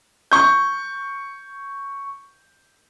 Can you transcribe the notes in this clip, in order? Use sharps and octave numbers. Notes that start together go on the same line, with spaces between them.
C#6 G6